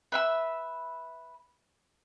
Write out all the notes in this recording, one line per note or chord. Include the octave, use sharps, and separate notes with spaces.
B4 E5 E6